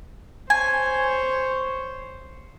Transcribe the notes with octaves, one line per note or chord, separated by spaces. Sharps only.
C5 C#5 G#5